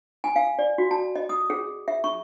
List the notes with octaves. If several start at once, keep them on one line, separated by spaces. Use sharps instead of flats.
G#5
F5
D5
F#4
A5
D#5
D#6
G#4
E5
C#6